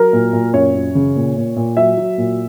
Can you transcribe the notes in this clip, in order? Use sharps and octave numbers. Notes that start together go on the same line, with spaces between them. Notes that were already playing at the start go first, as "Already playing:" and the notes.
Already playing: F#3 A#4
A#2
A#2
F#2 C#5
F#2
C#3
A#2
A#2
A#2
F#3 E5
F#3
A#2